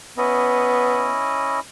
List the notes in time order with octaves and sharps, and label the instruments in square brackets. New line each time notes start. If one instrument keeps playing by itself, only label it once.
[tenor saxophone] B3 [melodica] C#4 E4 D#5